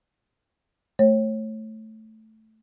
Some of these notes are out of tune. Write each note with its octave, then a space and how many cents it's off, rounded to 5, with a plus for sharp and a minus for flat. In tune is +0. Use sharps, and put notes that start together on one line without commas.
A3 +0 C#5 -30